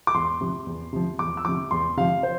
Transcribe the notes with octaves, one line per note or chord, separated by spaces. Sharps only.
D6
E2 C6
C3 F3
E2
C3 F3
E2 D6
E6
C3 F3 D6
E2 C6
C3 F3 F5
C5